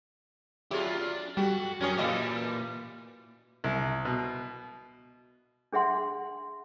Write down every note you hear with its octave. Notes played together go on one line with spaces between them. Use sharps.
F#3 D4 E4 F4 G4 G#4
D4
G3 F#4 G4 A4 G5
F#2 C#4 G#4 A#4 C#5 G#5
A#2 E3 G3 A4 D#5 F5 D6
C2
B2
D4 G#4 E5 F#5 C6